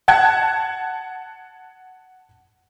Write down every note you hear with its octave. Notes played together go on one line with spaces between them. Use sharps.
F#5 A5 F#6 G#6